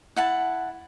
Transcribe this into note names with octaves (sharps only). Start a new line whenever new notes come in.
E4 F#5 A5